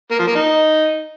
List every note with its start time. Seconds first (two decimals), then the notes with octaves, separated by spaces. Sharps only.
0.11 A#3
0.19 F3
0.27 A#3
0.35 D#4